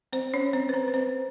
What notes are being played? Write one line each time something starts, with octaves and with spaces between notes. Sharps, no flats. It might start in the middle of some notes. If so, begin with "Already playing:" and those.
C4 C5
C#4 C#5
C4 C5
B4
C4 C5
B4
C4 C5